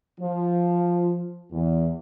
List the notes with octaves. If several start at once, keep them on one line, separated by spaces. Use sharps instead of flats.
F3
E2